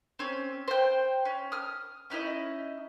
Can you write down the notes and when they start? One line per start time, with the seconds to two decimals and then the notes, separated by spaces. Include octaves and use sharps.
0.19 C4 C#4
0.68 C5 G5
1.25 C#4
1.52 D#6 F6
2.10 C#4 D#4 E4 D#5